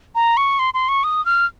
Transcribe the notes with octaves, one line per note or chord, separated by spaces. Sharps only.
A#5
C#6
C6
C6
C#6
D#6
F6